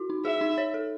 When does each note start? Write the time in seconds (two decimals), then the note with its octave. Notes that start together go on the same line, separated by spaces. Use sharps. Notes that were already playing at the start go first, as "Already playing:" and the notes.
Already playing: E4 F#4
0.10 D#4
0.25 G#4 E5
0.41 D#4
0.58 C#5
0.74 A4